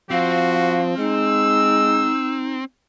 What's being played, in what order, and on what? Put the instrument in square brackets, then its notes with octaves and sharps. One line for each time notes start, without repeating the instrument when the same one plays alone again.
[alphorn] F3 [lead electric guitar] C4 [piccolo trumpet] F#4 [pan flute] F5
[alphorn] G#3 [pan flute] D#4 [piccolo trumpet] E6